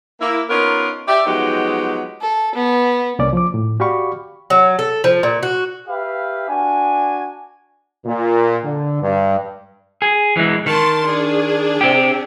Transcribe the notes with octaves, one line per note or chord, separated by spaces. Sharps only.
A#3 E4
B3 C#4 D#4 F4 A#4
G4 D5 E5
F3 F#3 G#3 B3 D#4 G4
A4
B3
C2 A#3 C#4 D5
F3 D6
A2
F#4 G4 D5 F5 B5 C#6
F#3
A4
F3
A#2
F#4
G4 B4 E5 F5
D4 F#4 G#5
A#2
D3
G2
G#4
E3 G#3
D#3 A#4 A5 C6
D4 G#4
C4 G4